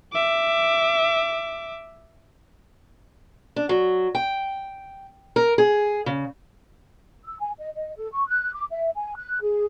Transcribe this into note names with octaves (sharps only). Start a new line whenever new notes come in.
E5 D6
D4
F#3
G5
A#4
G#4
C#3
E6
G#5
D#5
D#5
A4
C#6
F#6
D6
E5
G#5
F#6
G#4